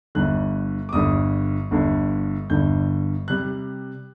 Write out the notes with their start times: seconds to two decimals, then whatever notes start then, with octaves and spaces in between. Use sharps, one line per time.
0.15 G1 G2 D3 F#6
0.89 D6
0.93 G1 G2 D3 D#6
1.71 G1 G2 D3
2.50 G1 G2 D3 G6
3.28 C3 G3 F#6